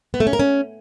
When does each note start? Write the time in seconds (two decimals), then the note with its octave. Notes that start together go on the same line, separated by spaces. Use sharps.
0.14 B3
0.20 A3
0.27 C#4
0.33 A#4
0.39 C#4